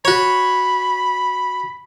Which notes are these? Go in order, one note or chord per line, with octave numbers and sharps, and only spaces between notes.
F#4 C#5 B5